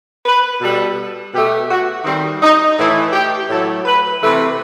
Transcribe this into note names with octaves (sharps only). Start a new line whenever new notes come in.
B4
B2 G3 A4
B2 A3 G4
F#4
D#3 G3 C4
D#4
A2 E3 A3 E4
G4
A2 F#3 A3 A4
B4
C3 E3 A3 B4